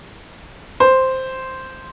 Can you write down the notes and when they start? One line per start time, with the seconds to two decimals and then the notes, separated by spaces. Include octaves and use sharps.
0.80 C5